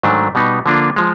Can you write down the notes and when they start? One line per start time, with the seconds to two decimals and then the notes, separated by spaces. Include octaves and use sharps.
0.03 G#2 D#3 F#3 A3 D4
0.35 B2 G3 B3 D#4
0.66 D3 F3 A#3 D4 F4
0.96 F3 G#3